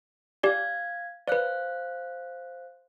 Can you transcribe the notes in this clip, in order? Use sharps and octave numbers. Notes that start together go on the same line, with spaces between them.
G4 D5 F5 G#5 G#6
B4 C5 D5 F5 F#6